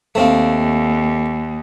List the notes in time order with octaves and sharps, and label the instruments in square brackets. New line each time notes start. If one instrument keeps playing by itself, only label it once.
[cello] D#2 [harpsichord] A3 C4 F5